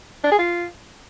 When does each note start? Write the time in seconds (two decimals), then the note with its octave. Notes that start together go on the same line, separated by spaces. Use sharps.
0.24 D4
0.31 G#4
0.39 F4